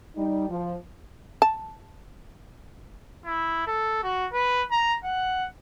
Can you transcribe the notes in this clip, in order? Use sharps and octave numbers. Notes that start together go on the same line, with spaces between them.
G3 D#4
F3
A5
E4
A4
F#4
B4
A#5
F#5